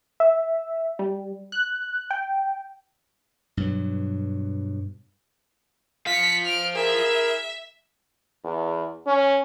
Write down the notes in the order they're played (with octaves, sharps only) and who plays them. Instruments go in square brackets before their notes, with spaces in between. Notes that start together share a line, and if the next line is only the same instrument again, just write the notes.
[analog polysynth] E5
G3
F#6
G5
[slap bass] G2 B2 F#3
[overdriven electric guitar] C5 F5 [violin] B6 C#7
[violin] F6 D7
[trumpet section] E4 G#4 A#4 [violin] E5
[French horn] E2
C#4